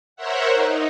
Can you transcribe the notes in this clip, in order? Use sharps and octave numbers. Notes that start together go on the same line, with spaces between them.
A#4 C5 C#5 E5 F#5
D#4